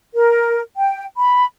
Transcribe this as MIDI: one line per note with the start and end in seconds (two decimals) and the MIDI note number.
0.14 0.60 70
0.75 1.04 79
1.16 1.45 83